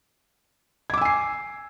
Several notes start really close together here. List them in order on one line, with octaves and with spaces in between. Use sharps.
G#6 D6 E6 G#5 C7